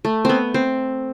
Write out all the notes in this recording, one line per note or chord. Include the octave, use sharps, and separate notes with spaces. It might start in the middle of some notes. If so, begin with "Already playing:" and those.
A3
B3 C4
C4